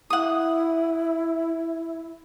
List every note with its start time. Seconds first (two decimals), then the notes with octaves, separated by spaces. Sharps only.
0.10 E4 F#5 D#6